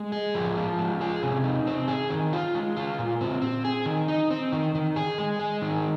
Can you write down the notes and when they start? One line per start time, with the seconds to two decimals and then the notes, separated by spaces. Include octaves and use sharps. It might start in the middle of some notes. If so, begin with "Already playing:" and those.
Already playing: G#3
0.12 G#4
0.35 F3
0.57 F4
0.79 G#3
1.01 G#4
1.23 C3
1.44 D#4
1.67 C4
1.88 G#4
2.10 D#3
2.33 F4
2.55 G#3
2.77 F4
2.98 A#2
3.21 C4
3.42 C4
3.65 G#4
3.86 D#3
4.08 D#4
4.30 C4
4.52 D#3
4.75 D#3
4.96 G#4
5.18 G#3
5.39 G#4
5.62 D#3